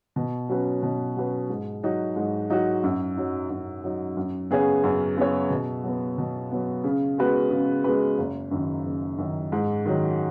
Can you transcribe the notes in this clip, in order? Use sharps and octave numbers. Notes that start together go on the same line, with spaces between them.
B2
F#3 C#4 F#4 B4
B2
F#3 C#4 F#4 B4
G#2
F#3 D#4 F#4
G#2
F#3 D#4 F#4
F#2
F#3 D#4
F#2
F#3 D#4
F#2
C#3 B3 G#4 C#5
F#2
C#3 B3 G#4 C#5
B2
F#3 B3
B2
F#3 B3
C#3
G#3 B3 F#4 B4
C#3
G#3 B3 F#4 B4
F#1
F#2 D#3
F#1
F#2 D#3
G#2
D#3 F#3